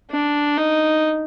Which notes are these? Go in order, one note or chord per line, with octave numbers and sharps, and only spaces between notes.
D4
D#4